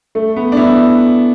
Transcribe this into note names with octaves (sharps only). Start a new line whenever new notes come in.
A3
B3
D4
B3 E4